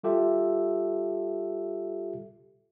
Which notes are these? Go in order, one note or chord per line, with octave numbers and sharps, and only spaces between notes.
G3 F4 G4 A4 E5